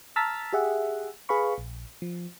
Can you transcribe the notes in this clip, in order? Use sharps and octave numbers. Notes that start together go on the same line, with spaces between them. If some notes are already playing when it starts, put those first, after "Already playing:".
A5 A#5 E6 F6 A6 B6
G4 G#4 E5 F#5
G#4 B4 F5 B5 C#6
A#1
F3